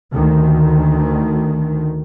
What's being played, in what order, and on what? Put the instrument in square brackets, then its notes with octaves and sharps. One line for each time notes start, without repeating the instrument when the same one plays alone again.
[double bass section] D2 D#3